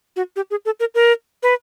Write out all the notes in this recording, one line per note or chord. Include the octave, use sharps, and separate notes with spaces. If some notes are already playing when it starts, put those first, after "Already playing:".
F#4
G4
G#4
A4
A#4
A#4
B4